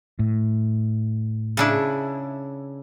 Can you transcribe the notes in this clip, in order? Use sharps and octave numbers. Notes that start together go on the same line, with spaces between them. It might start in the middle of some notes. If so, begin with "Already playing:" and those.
A2
C#3 D4 E4